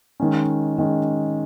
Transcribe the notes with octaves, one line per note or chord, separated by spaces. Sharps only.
D#3 G#3 C#4
D#3 G#3 C#4